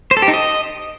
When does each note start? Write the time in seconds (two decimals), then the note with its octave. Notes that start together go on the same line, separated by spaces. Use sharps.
0.11 C5
0.17 A4
0.22 G4
0.28 D#4
0.34 D#5